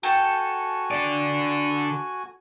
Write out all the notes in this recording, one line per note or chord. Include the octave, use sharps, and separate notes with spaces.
F#4 A4 G5 G#5
D3 D5